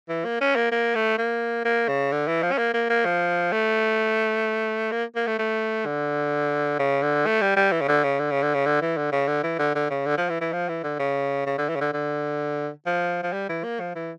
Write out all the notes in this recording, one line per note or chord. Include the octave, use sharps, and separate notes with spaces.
E3
A#3
C#4
A#3
A#3
A3
A#3
A#3
C#3
D3
E3
F3
C#4
A#3
A#3
A#3
F3
A3
A#3
A#3
A3
A3
D3
C#3
D3
A3
G3
G3
E3
C#3
D3
C#3
D3
C#3
D3
C#3
D3
E3
D3
C#3
D3
E3
D3
D3
C#3
D3
F3
E3
E3
F3
E3
D3
C#3
C#3
D3
E3
C#3
D3
D3
F3
F3
G3
E3
A#3
F3
E3